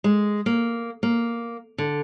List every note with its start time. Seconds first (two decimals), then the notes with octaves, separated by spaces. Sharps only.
0.04 G#3
0.46 A#3
1.03 A#3
1.78 D3